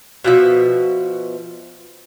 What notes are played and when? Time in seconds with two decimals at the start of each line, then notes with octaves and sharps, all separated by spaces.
0.24 B2 F3 E5